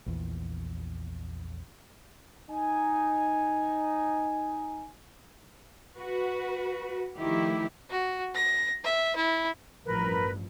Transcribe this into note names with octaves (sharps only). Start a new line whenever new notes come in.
A#1 E2
D#4 G#5
F#4 B4
D#3 F3 A3 E4 G4
F#4
A#6
E5
E4
A1 G2 F3 A#4 B4